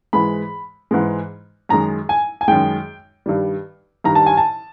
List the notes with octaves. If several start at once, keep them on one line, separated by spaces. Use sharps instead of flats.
G#2 E3 G#3 B5
G#2 E3 G#3
F#2 D#3 G#3 A#5
G#5
G#5
F#2 D#3 G#3 G5
G2 D#3 G3
G2 D#3 G3 A#5
A5
G#5
A5